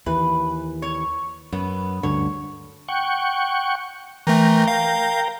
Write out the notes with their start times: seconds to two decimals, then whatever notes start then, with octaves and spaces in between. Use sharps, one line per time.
0.06 D#2 E3 B4
0.82 C#5
1.52 F#2 B3
2.03 D2 G2 D3 C#5
2.88 F#5 G5 C#6
4.27 E3 A3 A#4 G5 A#5
4.68 F5